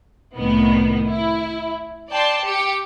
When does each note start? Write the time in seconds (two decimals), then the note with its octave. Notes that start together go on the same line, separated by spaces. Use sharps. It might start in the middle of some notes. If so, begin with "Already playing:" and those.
0.36 C2 A2 D#3 B3
1.07 E4
2.11 D5 G5 A5 C6
2.45 G4 C#7